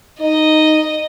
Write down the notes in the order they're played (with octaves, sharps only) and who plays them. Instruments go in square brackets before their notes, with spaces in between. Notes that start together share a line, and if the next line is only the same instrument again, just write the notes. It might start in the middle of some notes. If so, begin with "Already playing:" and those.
[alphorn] D#4 [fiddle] D#5